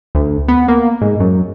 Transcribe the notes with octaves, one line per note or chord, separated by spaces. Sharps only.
D2
B3
A#3
G#2
F#2